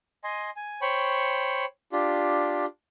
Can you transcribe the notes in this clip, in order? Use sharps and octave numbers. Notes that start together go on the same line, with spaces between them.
D#5 G#5 C6
G#5
C5 C#5 G5 B5 C#6
D4 F4 G4